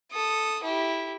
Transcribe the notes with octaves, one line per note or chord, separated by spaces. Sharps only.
A4 D#6
E4 G4